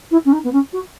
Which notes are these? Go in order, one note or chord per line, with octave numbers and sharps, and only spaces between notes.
E4
C#4
D#4
B3
C#4
F#4